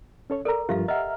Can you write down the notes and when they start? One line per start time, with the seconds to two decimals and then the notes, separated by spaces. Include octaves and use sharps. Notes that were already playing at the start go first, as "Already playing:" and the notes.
0.30 C#4 A4 C#5
0.45 A4 A#4 D5 A#5
0.69 G2 F3 F4 G4 E5 F5
0.88 D#5 E5 F#5 A#5 F6